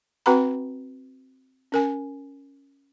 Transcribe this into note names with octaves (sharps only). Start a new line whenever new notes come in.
C4 F#4 B4 F#5 A#5 B5
C#4 A#4 G#5